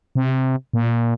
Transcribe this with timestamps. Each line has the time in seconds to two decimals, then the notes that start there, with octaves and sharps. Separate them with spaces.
0.15 C3
0.74 A#2